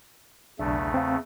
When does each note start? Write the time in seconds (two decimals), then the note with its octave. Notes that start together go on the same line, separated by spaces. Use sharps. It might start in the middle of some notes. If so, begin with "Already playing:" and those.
0.59 B1 E2 C#3 A3 D4 E5
0.94 C4 F5